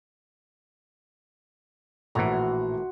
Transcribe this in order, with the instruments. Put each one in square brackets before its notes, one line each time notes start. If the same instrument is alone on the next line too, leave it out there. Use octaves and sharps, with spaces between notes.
[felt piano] A#1 A#5 [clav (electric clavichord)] A2 E3 [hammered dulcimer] F#4 C6